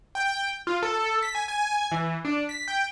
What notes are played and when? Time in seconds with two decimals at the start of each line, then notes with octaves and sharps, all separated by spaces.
0.15 G5
0.67 F4
0.83 A4
1.23 B6
1.35 G#5
1.48 G#5
1.92 E3
2.25 D4
2.49 B6
2.68 G5